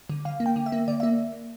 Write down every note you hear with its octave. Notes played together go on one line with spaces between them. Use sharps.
D3
D3 F5
A#3
G5
D3
E5
A#3
D3 D5
A#3 E5